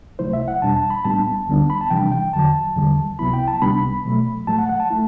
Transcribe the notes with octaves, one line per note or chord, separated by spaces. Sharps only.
C2 C3 F#3 A3 E4 C5
E5
F#5
E2 B2 G3 D4 A5
A5
B5
A2 G3 B3 D4 A5
D2 D3 G3 B3 D4
B5
A5
C3 E3 G3 D4 G5
G5
E2 D3 F#3 A5
E2 D3 G3
C2 C3 F#3 B3 E4 B5
G5
A5
C2 C3 G3 B3 D4 B5
B2 F#3 A3
A2 F#3 A3 A5
F#5
F#5
A5
A3 E4